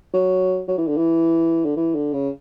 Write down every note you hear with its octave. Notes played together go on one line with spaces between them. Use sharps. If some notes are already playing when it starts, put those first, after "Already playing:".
F#3
F#3
E3
D3
E3
D3
E3
D3
C#3